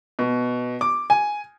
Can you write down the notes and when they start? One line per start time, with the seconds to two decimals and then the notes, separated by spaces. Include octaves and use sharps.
0.19 B2
0.81 D6
1.10 G#5